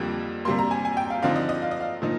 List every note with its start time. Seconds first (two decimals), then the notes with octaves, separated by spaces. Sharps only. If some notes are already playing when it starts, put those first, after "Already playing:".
Already playing: F2 D3 G3 A#3
0.45 C3 G3 A#3 C6
0.59 A#5
0.71 G#5
0.85 G#5
0.97 G5
1.10 F5
1.22 D3 F3 C4 D#4 F5
1.36 D#5
1.49 D#5
1.62 F5
1.71 D#5
1.81 F5
2.02 A#2 F3 D#4